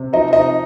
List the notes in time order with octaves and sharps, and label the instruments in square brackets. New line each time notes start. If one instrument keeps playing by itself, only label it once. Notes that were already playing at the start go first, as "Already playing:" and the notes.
Already playing: [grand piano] C3
F3 D#4 D#5
D#4 D#5